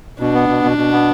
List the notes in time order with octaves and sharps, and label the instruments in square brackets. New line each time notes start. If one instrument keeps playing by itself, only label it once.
[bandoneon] B2 [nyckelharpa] D4
[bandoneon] B3
B2
B2
B2
B3